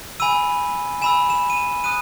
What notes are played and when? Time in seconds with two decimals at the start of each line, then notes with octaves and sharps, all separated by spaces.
0.20 G#5 B5 E6 D#7
1.02 G#5 B5 E6 E7
1.30 E7
1.50 D#7
1.57 E7
1.84 D#6 F#6 D#7